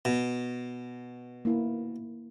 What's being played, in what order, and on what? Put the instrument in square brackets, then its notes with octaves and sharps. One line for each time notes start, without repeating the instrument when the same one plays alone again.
[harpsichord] B2
[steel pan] A#3 E4